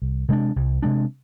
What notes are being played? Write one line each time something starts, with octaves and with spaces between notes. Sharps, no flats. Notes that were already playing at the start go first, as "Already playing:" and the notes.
C2
C3 G#3 D4
C2
C3 G#3 D4